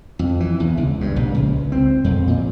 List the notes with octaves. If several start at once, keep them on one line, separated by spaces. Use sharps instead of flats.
F2
E3
E2
C#2
G2
A#1
C#2
C4
F2
A#2